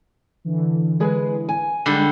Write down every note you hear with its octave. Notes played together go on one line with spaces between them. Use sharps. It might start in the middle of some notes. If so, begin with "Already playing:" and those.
D3 E3
G#3 G#4 B4
G#5
D3 G3 G#3 D#4